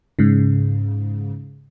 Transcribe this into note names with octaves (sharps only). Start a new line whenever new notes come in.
G#2 C#3